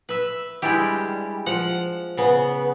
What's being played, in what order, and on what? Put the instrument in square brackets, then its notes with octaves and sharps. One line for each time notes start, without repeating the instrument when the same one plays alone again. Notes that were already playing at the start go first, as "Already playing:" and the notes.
[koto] B4 E5
G3 G#3 D4 E4 G4
F3 F#5
C#3 B3